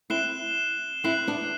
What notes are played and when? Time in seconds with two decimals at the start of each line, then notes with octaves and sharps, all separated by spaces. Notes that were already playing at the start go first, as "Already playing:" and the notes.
0.10 C4 E4 F#6 C7 E7 G7
1.04 C4 E4 F#6 C7 F#7
1.27 B3 D4